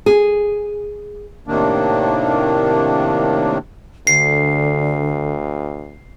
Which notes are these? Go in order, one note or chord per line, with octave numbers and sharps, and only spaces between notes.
G#4
A2 C3 D#3 A#3 D4
D2 D3 C7